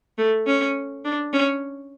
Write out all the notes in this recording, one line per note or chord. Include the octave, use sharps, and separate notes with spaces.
A3
C#4
D4
C#4